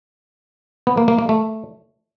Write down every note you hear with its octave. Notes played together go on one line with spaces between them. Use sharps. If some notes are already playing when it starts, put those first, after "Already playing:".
B3
A#3
A#3
A#3
A3